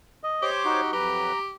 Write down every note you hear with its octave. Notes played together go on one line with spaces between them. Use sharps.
D#5
G4 C5 C#5 D6
D#4 F#4
F2 F#3 G4 B4 A#5